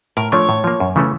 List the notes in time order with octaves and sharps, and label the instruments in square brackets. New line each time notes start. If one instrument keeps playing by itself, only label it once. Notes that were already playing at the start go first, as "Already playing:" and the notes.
[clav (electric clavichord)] A2 [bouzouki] A#4
[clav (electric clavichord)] F3 A3 D4 [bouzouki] C#5
[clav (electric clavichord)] A2
F3 A#3
F#2
C#3 E3 A3 C#4